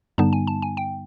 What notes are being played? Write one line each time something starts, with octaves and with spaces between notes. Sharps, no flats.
G2 D3 G3 B3 D#4 A5
G#5
A5
G#5
G5